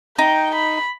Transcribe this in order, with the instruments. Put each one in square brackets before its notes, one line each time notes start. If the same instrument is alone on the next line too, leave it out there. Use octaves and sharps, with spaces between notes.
[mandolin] D#4 [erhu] G5
[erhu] B5